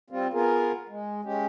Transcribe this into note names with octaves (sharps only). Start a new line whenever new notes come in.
G3 C4 F4
B3 F4 G#4 A#4
G#3
G#3 C#4 G4